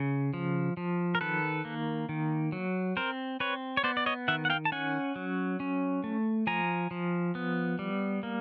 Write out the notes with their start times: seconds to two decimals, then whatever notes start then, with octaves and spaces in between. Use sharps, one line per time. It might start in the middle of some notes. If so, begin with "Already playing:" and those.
Already playing: C#3
0.33 F3
0.77 F3
1.15 A#4
1.21 D#3 A4 B4
1.65 A#3
2.09 D#3
2.52 F#3
2.97 C4 A#4 C5
3.40 C4 B4 C#5
3.77 C#5
3.84 B3 C5 D5
3.97 D5
4.06 C#5 D#5
4.28 D#3 E5 F#5
4.45 F#5
4.50 F5 G5
4.65 A5
4.72 C#4 F#5 G#5
5.16 F#3
5.60 C#4
6.04 A3
6.47 F3 G#5 A#5
6.91 F3
7.35 B3
7.79 G3
8.23 A#3